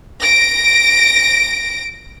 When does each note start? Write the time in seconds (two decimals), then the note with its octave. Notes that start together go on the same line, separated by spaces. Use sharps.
0.22 A#6 D7